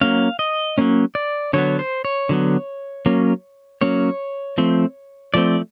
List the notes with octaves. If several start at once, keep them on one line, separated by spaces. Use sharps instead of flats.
F#3 A#3 C#4 F5
D#5
F#3 A#3 C#4
D5
D3 F#3 B3 C#5
C5
C#5
D3 F#3 B3
F#3 A#3 C#4
F#3 A#3 C#4 C#5
F3 A3 C4
F3 A3 C4 D5